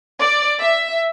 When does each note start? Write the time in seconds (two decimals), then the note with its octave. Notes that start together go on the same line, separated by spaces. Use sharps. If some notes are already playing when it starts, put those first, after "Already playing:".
0.20 D5
0.62 E5